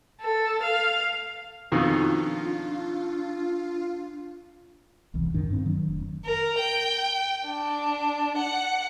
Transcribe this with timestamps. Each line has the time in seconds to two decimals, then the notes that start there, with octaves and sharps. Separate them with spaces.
0.21 A4
0.63 F5
1.72 F2 B2 D#3 D4 F4
5.14 E1 C2 D#3 E3
5.34 A1 F#2 D#3 D4
5.50 G2 C4
5.66 D#3 F#3 D4
5.88 F1
6.24 A#4
6.59 G5
7.46 D4
8.36 F#5